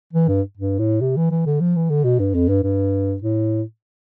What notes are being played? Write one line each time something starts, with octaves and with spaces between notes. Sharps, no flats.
E3
G2
G2
A2
C3
E3
E3
D3
F3
E3
D3
B2
G2
F2
G2
G2
A2